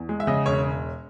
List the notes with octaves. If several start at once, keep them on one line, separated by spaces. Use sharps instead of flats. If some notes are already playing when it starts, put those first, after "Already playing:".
Already playing: E2
G#3
E5
C#3 D#5
E1 C#5